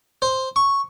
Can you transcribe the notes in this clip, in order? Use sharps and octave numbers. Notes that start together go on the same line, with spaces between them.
C5
C#6